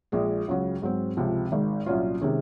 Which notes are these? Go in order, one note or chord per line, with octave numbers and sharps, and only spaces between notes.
A#1 A#2 G#3
C#2 C#3 F#3
G#2 F#3 C4
C#2 C3 F3
G#1 G#2 D#3
C2 A#2 F#3 C#4 F4
C3 D#3 G#3 C#4